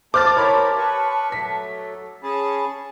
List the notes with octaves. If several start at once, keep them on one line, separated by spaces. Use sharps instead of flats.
A3 C5 A5 D6 F6 A6
E4 G4 A#4 C#5 B5 C6
B4 C#6
F#3 A3 B6
C#4 G#4 A5 B5